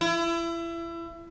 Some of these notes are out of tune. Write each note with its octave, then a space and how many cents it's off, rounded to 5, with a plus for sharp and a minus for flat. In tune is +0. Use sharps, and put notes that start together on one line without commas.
E4 +30